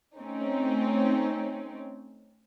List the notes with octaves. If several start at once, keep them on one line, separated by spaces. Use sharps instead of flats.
A3 C4 C#4 D#4